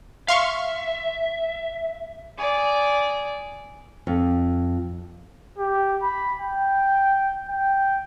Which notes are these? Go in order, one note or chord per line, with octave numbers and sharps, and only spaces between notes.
E5 F5 C6 C#6
G#4 D5
F2
G4
B5
G5
G5